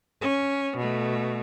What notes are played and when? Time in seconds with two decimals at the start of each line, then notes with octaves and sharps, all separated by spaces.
0.21 C#4
0.77 B2 A3